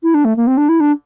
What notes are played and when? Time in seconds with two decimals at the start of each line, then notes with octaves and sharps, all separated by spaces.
0.03 E4
0.14 D4
0.24 A3
0.36 A#3
0.47 C4
0.57 D4
0.68 E4
0.80 D4